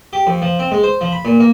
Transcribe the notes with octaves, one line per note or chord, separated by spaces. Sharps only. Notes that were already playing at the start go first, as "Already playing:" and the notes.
G4
F2
F3
C4
G#3
C5
F3
B5
A#2
A#3